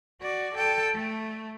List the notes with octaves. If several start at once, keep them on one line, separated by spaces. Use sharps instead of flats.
F#4 D5
A4 G5
A3